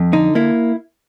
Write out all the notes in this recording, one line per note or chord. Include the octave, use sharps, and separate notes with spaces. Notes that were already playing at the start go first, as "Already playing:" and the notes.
Already playing: F2
D3 D#4
A#3 E4